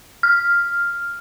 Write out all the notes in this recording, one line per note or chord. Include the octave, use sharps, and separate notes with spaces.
F6